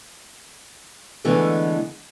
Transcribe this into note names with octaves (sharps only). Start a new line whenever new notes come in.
D3 E3 G#3 A3 B3